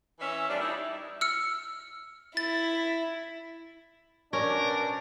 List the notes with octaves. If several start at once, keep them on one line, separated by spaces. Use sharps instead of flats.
E3 C#4 E5
D#2 G3 D4
G3 D#4 E4
E6 F6 C#7
E4 A6
B2 C#4 D4 A#4 D5